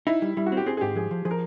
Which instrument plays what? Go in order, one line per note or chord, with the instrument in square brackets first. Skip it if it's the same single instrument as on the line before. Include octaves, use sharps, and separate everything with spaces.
[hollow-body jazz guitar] D#4 [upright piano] E4
[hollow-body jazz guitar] G3
[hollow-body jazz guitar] G3 [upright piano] E4
[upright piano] F#4
[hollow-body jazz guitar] C4
[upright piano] G4
[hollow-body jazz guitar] C4 [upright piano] G#4
[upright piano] G#4
[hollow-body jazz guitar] G#2 [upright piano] G4
[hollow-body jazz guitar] F3 [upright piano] G#4
[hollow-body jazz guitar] F3
[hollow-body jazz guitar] F3 [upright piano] G#4
[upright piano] A#4